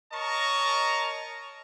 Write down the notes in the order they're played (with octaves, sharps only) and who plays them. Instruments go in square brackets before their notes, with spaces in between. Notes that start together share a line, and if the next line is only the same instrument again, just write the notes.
[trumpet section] A#4 C#5 D#5 A5 A#5 C#6